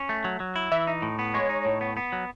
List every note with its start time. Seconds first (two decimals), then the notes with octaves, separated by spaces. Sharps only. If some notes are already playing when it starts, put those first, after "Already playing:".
Already playing: C#4
0.09 A3
0.24 F#3
0.40 F#3
0.56 E4
0.72 E3 E5
0.87 D#4
1.02 A2
1.19 B3
1.34 G#3 C#5
1.49 D#4
1.65 A2
1.81 B3
1.97 B3
2.12 F#3